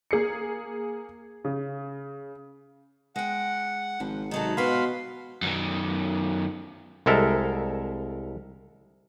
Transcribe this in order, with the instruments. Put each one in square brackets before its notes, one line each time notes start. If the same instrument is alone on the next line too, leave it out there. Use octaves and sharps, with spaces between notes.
[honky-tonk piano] A#3 G#4 C7 C#7
C#3
[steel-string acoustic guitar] G#3 G5 [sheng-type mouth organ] F#5
[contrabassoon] G#1 [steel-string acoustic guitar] F3
[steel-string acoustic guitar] C3 F#3 A4 [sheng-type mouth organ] D#4
[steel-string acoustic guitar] G#2 F#4 B4 [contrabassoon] B2 [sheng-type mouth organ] F5 B5 C6
[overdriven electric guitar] F#2 D#3
[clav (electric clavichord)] C2 G#3 A4 A#4 E5